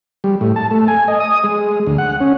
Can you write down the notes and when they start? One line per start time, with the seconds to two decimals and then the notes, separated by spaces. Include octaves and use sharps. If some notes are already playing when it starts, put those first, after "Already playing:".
0.24 G3
0.41 A2
0.56 A5
0.71 A3
0.88 G#5
1.08 D#5
1.20 D#6
1.44 G#3
1.87 D2
1.98 F#5
2.21 C#4